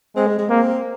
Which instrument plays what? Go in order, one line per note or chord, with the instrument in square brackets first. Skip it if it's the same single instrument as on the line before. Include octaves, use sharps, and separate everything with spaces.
[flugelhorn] G#3 [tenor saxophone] C4
[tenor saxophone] G#3
G#3
[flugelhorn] A#3 [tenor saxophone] C4